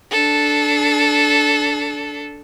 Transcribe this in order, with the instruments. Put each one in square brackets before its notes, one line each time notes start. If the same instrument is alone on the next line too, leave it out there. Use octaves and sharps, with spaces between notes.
[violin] D4 A4